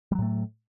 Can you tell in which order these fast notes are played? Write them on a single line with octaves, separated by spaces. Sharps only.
G3 F#3 A2 A3